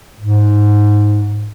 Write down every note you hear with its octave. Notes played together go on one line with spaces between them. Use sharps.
G#2